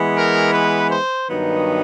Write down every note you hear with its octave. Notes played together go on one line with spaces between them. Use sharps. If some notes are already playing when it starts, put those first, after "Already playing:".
Already playing: E3 G#3 B3
A#4
B4
C5
G2 D#3 F#3 B3 D#4